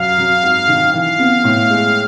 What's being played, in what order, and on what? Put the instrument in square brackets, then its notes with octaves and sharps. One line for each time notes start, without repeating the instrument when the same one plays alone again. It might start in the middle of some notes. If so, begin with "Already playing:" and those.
Already playing: [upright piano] F#2 [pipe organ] F5
[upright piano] F#3
G#1
D#3
[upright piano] E3 [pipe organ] F5
[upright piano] B3
A2
G#3